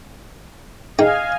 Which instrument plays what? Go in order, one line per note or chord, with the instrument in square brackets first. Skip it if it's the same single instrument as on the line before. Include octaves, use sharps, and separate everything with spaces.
[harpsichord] D#4 G#4 G5 [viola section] D#5 F5 G#5